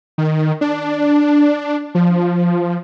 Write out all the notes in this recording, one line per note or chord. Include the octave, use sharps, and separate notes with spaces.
D#3
D4
F3